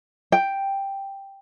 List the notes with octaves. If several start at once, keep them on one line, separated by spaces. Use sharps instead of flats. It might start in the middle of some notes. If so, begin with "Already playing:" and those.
G5